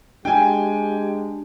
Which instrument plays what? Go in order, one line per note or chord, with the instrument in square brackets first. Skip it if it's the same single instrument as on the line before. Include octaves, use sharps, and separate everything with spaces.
[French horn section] G#3 G4 [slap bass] D4 [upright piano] G5 G#5